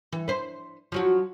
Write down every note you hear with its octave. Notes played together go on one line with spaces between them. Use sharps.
E3
B4 C5
F3 F#3 F#4